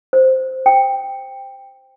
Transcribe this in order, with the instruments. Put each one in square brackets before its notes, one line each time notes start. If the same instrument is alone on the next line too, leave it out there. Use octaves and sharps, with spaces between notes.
[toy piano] C5
G5